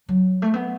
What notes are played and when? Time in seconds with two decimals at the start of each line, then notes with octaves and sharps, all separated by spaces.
0.09 F#3
0.42 A3
0.54 B3